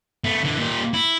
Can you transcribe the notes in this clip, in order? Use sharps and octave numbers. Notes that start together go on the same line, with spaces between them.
A3 B3
D3 E3
A#2 G4
E4